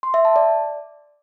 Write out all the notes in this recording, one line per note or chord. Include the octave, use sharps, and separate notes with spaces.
C6
E5
A5
D5